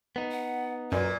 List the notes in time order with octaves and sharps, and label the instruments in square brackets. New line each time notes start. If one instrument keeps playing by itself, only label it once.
[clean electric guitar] B3 D#4
[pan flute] F#5
[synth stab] F#2 [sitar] A#2 [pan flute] B4